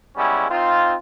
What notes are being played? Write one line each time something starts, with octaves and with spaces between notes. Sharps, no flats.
G3 G#3 B3 C#4 E4
C4 D#4 F4